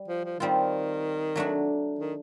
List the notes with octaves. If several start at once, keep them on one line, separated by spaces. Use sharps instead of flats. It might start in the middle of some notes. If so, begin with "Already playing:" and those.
Already playing: G3
F3
F3
D#3 G3 C4 F4
F#3 A3 D4 F#4
D#3